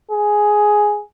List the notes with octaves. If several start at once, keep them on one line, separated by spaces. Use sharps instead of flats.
G#4